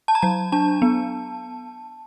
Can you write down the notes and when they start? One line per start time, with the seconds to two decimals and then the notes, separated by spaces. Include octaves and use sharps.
0.08 A5
0.15 A#5
0.22 F#3 A5
0.52 D4 A5
0.82 B3